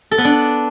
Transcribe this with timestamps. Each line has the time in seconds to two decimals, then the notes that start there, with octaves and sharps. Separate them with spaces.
0.11 A4
0.18 B3
0.25 D4